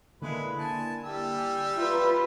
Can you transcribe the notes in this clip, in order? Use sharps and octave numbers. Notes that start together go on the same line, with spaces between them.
D3 G#3 A#3 E4 B4
G#5 A5
G3 G4 E6
G#5
F4 B4 E5 A#5 G#6